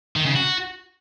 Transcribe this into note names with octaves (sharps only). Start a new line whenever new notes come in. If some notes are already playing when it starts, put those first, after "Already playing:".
D#3
C#3
F#4